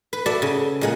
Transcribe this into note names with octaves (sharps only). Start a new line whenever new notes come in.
B4
F#4 A4 D5 E5
C#3
A#2 G#3 F#5